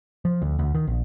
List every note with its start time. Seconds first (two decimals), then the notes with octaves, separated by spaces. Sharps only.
0.25 F3
0.42 D2
0.59 D2
0.75 D#3
0.87 A#1